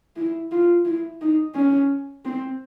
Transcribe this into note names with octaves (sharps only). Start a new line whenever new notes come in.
E4
F4
E4
D#4
C#4
C4